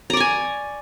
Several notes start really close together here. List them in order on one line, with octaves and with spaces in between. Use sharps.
A#5 D5 C#6 G#5